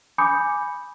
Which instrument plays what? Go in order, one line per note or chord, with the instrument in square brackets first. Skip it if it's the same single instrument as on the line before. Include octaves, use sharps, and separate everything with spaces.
[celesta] G#5 B5 D6 D#6 G6 C#7